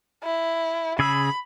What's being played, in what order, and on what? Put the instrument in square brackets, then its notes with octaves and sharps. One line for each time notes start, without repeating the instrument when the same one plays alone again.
[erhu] E4
[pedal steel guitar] C#3 G#4 E6 [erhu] B5